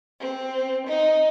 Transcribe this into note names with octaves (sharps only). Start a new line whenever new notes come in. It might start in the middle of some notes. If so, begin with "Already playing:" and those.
C4
D#4